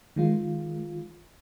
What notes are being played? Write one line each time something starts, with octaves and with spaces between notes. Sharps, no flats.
D#3 G#3 F4